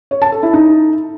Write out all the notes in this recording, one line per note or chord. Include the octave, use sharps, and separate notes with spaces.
C#5
A5
A4
E4
D#4